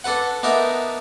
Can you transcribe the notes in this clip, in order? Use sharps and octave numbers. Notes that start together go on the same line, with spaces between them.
D4 A4 B4 F#5
B3 D4 D#4 A#4 E5